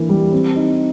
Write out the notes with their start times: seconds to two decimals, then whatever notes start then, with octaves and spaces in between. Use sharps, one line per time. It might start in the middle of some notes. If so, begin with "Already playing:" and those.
Already playing: E3 A#3 D4
0.09 G3
0.32 C4
0.56 D#4